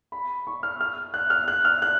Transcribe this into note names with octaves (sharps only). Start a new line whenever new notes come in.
B5
C#6
F6
F6
F#6
F6
F#6
F6
F#6